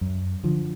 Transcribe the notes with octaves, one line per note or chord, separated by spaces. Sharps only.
F#2
D3 F3